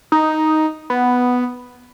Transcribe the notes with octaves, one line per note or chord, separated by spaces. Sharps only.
D#4
B3